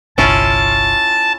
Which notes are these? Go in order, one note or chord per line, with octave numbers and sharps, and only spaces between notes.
G1 C2 C#4 E4 F4 A5